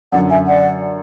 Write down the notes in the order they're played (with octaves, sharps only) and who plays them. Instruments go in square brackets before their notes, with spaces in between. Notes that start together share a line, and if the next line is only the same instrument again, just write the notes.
[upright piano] F#2 D3 F#3 [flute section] D5 F#5
[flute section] E5 G#5
D5 F#5